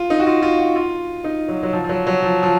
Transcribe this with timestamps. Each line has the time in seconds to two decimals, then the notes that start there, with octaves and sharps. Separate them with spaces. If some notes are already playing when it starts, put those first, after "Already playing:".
Already playing: F4
0.10 D#4
0.20 F#4
0.27 F4
0.42 F4
0.59 F#4
0.76 F4
1.24 D#4
1.48 F#3
1.63 F#3
1.73 F3
1.84 F3
1.89 F#3
2.07 F#3
2.23 F3
2.43 F3